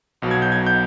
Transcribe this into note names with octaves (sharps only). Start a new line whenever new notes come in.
B1 B2 F#3
G#6
G6
G#6
G6